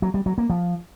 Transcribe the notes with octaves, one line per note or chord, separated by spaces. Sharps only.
F#3
G3
F#3
A#3
F3